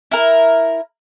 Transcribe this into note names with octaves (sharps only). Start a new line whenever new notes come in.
E4 A#4